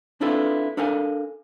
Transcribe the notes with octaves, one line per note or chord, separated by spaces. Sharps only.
C4 D4 E4 F4 A4 B4
D4 A4 A#4 F5 G#5